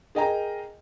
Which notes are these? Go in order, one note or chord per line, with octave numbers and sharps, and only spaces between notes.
G#4 A#4 D#5 G5 G#5 A#5